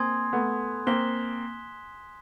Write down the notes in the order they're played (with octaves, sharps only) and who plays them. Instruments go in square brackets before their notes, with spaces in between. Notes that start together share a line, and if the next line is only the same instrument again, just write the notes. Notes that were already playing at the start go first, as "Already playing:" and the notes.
Already playing: [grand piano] A#3 C4 [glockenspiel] G#5 C6 D#6 G#6
[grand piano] A3 B3
[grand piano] A#3 C4 [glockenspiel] F#6 B6 E7 G7